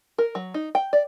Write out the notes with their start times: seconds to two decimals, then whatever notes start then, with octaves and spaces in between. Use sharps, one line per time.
0.18 A#4
0.35 F#3
0.54 D#4
0.75 G5
0.93 D5